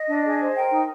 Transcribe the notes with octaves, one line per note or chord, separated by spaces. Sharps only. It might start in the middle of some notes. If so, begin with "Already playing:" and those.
Already playing: D#5
D4
G#4
C5
A#4 G5
D#4